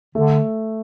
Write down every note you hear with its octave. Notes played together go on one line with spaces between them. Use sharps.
D3 A3